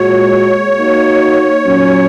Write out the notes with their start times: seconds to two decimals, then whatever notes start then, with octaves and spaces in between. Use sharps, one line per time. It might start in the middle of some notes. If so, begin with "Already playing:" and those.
Already playing: A#2 G#3 F#4 C#5
0.78 A#3 D#4 F#4
1.66 A#2 F#3 C#4